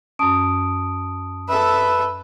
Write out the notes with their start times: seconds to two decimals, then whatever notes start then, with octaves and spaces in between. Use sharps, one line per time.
0.19 F#2 C#4 A5 D#6 D7
1.49 A4 B4 E5